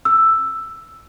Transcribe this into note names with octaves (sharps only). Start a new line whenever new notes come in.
E6